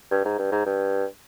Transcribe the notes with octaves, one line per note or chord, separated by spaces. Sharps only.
G2
G#2
G2
G#2
G2